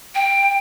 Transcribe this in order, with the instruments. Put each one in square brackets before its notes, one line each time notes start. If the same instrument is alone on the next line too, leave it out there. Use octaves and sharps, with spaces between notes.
[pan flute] G5